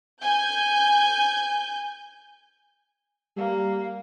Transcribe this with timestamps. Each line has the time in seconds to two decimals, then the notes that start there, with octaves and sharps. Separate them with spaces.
0.20 G#5 G6
3.37 G3 A#3